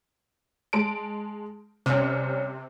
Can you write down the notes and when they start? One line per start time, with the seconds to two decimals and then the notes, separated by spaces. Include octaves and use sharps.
0.73 G#3 A5 D7
1.86 C2 C3 C#4